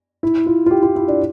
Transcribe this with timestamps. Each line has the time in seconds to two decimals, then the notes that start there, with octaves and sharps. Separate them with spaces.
0.23 E4
0.46 F4
0.66 F4
0.71 G4
0.83 F4
0.96 E4
1.08 D4